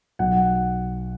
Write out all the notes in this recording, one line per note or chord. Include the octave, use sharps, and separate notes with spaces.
B1 F#5